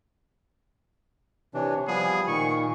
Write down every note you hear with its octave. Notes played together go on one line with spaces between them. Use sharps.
C3 E3 D4 C#5
F3 G3 B3 G#4 G#5
A#2 D#3 C#6